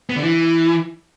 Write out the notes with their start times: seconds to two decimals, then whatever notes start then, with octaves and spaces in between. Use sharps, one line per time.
0.10 B3
0.16 D3
0.23 E3